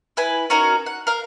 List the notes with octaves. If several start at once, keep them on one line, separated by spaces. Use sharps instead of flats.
E4 B4 G#5
C#4 D#4 F#4 A#4
F#5
A#4 F5